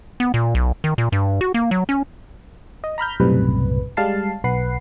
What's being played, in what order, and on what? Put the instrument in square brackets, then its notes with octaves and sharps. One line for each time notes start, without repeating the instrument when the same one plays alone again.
[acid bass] B3
A#2
B1
D#3
A#2
G2
F#4
A#3
F#3
C#4
[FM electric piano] D#5
A#5 B5 F6 G6
B1 F#2 A2 C3 G3 B4
G3 G#3 F5 A5 C7
B1 B4 F#5 C7